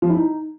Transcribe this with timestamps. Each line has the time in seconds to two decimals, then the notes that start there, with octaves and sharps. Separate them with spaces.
0.02 F3
0.09 E4
0.17 D#4